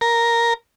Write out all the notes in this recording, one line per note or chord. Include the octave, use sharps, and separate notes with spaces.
A#4